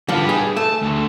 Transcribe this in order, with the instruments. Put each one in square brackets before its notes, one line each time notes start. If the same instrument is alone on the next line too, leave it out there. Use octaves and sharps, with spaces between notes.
[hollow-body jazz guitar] D3 F3 [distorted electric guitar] G3 B4
[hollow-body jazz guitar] G#4
[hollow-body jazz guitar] A3 [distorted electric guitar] A5
[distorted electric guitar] D2